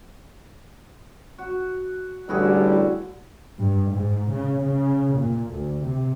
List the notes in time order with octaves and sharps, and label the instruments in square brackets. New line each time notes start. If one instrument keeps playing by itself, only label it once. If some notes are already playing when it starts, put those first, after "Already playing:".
[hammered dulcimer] F#4
[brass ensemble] A1 D3 G3 [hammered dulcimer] E4 F#4 G#4
[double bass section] G2
G#2
C#3
C#3
A#2
D2
C3